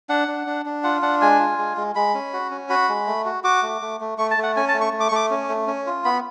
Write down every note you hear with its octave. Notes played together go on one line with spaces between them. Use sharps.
D4 F#5
D4
D4
D4
F4 F#5
D4 F#5
G#3 G#5
F4
G#3
G#3
G#3 B5
C#4
F#4
C#4
F#4 B5
G#3
A3
F#4
F#4 D6
A3
A3
A3
A3 C#6
A5
A3
F#5
C#4 G#5
A5
A3
C#6
A3
D6
C#6
A3 D6
C#4
A3
C#4
F4
B3 B5